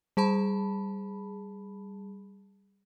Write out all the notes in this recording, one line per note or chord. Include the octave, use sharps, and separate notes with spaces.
G3 G#4 A5 B5